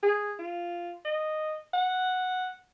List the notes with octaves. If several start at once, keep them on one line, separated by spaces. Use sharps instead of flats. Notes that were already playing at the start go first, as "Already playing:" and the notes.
G#4
F4
D#5
F#5